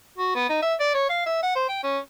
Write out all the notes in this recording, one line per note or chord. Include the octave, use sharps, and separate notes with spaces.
F#4
B3
D#4
E5
D5
C#5
F5
E5
F#5
C5
G5
C#4